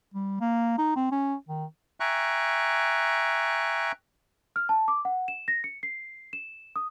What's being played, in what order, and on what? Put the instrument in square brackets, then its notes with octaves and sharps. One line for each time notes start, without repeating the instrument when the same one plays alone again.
[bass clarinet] G3
A#3
D#4
C4
C#4
D#3
[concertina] E5 G5 G#5 A#5 C#6 F#6
[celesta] F6
A5
D6
F#5
E7
A#6
C#7
C7
E7
D#6